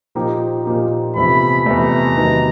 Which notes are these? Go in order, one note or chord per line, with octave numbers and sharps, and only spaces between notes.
A#2 F3 A#3 D#4 G4
A#2 F3 A#3 D#4 G4
E2 C3 F3 A3 B5
E2 C3 F3 A3 A#5
C3 D#3 F#3 B3 D#4